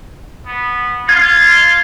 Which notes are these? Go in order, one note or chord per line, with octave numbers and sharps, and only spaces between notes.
B3
F4 G#6